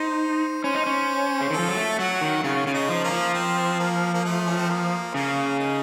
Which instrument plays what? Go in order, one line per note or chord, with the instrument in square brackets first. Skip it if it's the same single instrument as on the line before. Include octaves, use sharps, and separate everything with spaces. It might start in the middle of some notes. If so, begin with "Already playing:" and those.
Already playing: [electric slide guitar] D#4 [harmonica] C5
[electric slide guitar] C#4 [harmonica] C5
[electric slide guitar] D#4
C#4
C#3
D#3
[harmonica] A4
[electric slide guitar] F3
F#3
A3
[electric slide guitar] F#3 [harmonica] F#4
[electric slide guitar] D#3
[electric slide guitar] C#3 [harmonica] F4
[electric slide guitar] C#3 [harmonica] F4
[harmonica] D#4
[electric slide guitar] F3
[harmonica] A#3
[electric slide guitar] F3
[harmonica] C4
A#3
A#3
A3
C#4
C4
A#3
[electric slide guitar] C#3 [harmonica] A#3
[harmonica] D#4